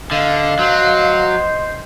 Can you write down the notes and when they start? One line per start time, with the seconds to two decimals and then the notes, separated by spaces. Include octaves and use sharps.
0.12 D3 D#5 F5
0.59 F#3 C5